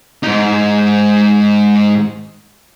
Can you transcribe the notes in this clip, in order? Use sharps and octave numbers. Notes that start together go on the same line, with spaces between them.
G#2 D#4